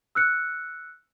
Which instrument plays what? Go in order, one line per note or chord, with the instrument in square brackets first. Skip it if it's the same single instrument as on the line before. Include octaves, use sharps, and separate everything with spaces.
[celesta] E6 F#6 C#7